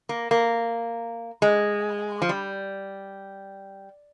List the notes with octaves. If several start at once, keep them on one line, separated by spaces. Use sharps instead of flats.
A#3
A#3
G#3
F3
G3